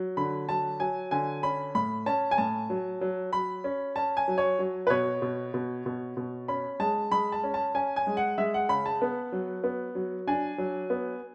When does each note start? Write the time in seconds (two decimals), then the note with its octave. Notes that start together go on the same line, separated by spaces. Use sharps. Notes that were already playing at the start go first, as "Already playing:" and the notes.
Already playing: F#3
0.17 D3 B5
0.48 F#3 A5
0.80 F#3 G#5
1.11 D3 G#5
1.43 C#4 B5
1.75 A2 B5
2.06 C#4 A5
2.31 G#5
2.38 A2 A5
2.70 F#3
3.01 F#3
3.32 F#3 B5
3.64 C#4
3.96 C#4 A5
4.17 G#5
4.28 F#3
4.38 C#5
4.59 F#3
4.87 B4
4.90 B2 C#5
5.22 B2
5.54 B2
5.86 B2
6.17 B2
6.48 C#4 B5
6.80 G#3 A5
7.11 G#3 B5
7.32 A5
7.44 C#4
7.54 A5
7.75 C#4 G#5
7.96 G#5
8.07 G#3
8.17 F#5
8.38 G#3 E5
8.54 F#5
8.69 C#3 B5
8.86 A5
9.02 B3
9.32 F#3
9.64 B3
9.95 F#3
10.28 D4 G#5
10.58 F#3
10.90 B3